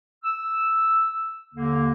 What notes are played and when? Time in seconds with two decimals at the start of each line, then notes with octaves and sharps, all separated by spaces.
0.24 E6
1.55 D#2 D3 A#3